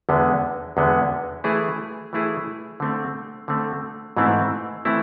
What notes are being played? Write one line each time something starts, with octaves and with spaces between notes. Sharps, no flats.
E2 D3 G#3 B3
E2 D3 G#3 B3
E3 A3 E4 G#4
E3 A3 E4 G#4
D3 A3 C4
D3 A3 C4
G#2 E3 A3 C4 E4
E3 A3 C4 E4